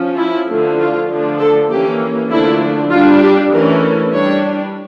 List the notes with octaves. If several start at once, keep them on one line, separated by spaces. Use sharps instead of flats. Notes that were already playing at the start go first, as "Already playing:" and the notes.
Already playing: F3 C#4
E4
D3 F3 A3 D4
F4
D3 F3 A3 D4
A4
E3 A#3 C#4 G4
D3 F3 A3 D4 E4
G3 D4 F4
G4
E3 A3 C#4 A#4
G3 D4 C#5